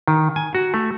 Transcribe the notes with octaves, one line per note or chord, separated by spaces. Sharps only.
D#3
G#5
F#4
A3